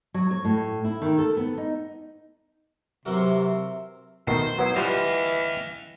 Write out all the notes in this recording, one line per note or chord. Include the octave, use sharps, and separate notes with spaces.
F#3
C#5
A2
E4
D#3
A4
B3
D#4
C3 E3 F#3 F#4 A#4 E5
B2 D#3 A3 C5
F#3 B3 E4
E3 G3 F4 D#5 F5 F#5